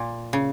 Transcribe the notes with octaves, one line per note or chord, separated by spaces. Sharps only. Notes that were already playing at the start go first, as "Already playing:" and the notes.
Already playing: A#2
C#3